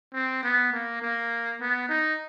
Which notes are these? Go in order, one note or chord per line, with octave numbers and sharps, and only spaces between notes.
C4
B3
A#3
A#3
B3
D#4